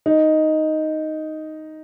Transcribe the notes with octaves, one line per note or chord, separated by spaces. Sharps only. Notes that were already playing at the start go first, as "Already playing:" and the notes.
D#4